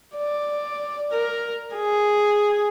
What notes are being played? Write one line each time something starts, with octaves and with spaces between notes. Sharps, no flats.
D5
A#4
G#4